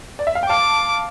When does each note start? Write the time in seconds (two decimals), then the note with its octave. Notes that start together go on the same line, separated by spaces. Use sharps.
0.19 D5
0.27 E5
0.35 F5
0.43 G5
0.49 F5 A5 D6